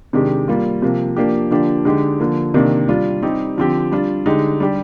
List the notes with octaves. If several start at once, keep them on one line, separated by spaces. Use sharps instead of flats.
C3 D#3 G#3 D4 G4
G3 A#3 F4
C3 F3 A#3
F3 A#3 D4 G4
D3 F3 A#3 D4 G4
D3 G#3 D#4 G4
D3 F3 A#3
C3 D#3 A#3 D4
G3 D4 F4
G3 C4 D#4 G4
D3 F3 C4 G4
G3 D4 F4
D3 G#3 D#4 G4
G3 D4 G4